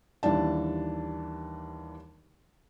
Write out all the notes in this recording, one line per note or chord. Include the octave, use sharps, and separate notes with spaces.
D#2 E3 G3 D4 A5